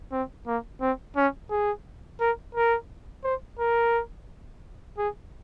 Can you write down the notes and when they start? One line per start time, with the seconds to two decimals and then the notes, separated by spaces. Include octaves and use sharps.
0.12 C4
0.47 A#3
0.81 C4
1.17 C#4
1.51 G#4
2.21 A#4
2.55 A#4
3.24 C5
3.59 A#4
4.98 G#4